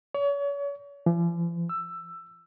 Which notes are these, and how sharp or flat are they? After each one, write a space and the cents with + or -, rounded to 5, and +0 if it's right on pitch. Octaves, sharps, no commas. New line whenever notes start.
C#5 +35
F3 -45
E6 +10